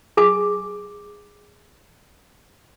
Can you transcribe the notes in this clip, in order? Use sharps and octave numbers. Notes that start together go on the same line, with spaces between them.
G#4 G#5 D6